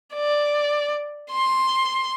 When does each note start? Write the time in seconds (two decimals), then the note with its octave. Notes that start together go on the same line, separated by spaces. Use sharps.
0.14 D5
1.31 C6